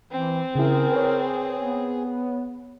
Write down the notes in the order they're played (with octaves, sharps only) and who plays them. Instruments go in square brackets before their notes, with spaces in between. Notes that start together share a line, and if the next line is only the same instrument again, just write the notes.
[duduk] E3 [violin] C4
[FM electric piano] C#3 E4 [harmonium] G#4 [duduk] A#4
[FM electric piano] B4 C#5
[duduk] B3